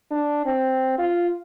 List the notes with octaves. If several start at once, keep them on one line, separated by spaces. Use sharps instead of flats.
D4
C4
F4